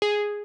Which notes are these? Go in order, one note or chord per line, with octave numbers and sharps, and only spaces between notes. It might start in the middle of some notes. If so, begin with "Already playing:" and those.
G#4